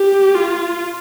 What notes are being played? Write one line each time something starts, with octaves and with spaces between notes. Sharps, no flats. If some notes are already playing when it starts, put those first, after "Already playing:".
Already playing: G4
F4